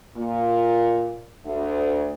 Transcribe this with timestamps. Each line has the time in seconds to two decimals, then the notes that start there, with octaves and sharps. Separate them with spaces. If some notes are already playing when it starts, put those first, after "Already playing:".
0.17 A#2
1.45 D2